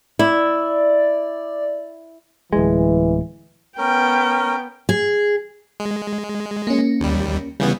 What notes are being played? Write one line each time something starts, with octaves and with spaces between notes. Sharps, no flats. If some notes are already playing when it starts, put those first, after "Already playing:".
E4 D5
D1 E3 G#3
B3 C#4 A#4 G5
G#4
G#3
A#3 C#4
D#2 G3
C#3 E3 G3 B3